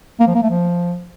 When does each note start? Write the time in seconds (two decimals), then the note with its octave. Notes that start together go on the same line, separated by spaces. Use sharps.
0.20 A#3
0.27 F3
0.35 A#3
0.42 A3
0.50 F3